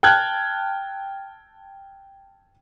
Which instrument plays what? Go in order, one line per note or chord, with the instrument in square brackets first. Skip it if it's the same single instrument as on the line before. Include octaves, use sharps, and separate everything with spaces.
[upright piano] G5 A5 F6 F#6 G#6